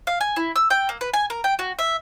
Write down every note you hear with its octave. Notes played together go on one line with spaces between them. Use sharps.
F5
G#5
E4
E6
G5
A#3
B4
G#5
A#4
G5
F#4
E5